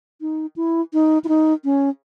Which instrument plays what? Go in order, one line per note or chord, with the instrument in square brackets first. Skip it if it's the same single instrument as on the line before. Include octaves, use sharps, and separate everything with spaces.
[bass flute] D#4
E4
D#4
E4
D#4
C#4